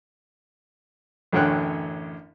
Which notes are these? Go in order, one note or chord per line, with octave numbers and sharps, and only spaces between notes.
A1 F#2 D3 C#5 G5 F#6